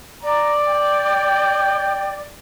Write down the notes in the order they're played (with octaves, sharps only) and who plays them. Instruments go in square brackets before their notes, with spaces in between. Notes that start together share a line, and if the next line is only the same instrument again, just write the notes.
[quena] D5 [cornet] A#5
[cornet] G5